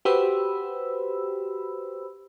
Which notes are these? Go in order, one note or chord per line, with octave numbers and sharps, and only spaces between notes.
F#4 G4 B4 C5 B5 E6